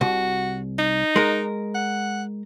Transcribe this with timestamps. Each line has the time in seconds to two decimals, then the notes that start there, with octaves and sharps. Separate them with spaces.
0.01 C2 F#4
0.79 D#4
1.16 G#3 A#4
1.75 F#5